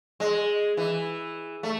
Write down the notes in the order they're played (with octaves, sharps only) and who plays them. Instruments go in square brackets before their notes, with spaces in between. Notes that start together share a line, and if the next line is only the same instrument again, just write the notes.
[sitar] G#3
E3
A3